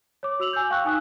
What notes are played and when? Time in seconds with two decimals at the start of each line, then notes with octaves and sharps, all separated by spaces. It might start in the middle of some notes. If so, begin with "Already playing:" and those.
0.23 C#5 D6
0.40 F#4 E6 F7 F#7
0.53 G#5 D6 E6 G6
0.70 F5 G5 C#6 F#6
0.85 D#4 G#5 D#6 F#6